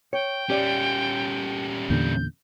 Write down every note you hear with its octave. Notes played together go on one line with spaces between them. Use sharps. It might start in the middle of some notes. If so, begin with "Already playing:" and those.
C#5 G5
G3 C#4 G4 D5
E2 A#2 D3 G6